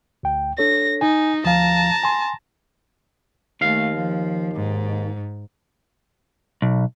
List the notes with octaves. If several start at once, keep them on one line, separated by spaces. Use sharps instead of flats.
D2 G5
D4 A4 C#5 A#6
D#4 G#5
D2 F3 F5 A5 A#5
G#5 C6
D#2 A3 F5
F3
G#2
B1